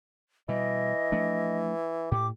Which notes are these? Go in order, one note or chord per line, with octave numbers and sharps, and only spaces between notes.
B2 E3 G3 D#5
F3 A3 D4
A2 G4 D6